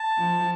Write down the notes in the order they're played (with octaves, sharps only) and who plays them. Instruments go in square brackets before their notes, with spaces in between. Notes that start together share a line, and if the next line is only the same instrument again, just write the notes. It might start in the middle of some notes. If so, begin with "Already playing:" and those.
Already playing: [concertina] A5
[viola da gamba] F3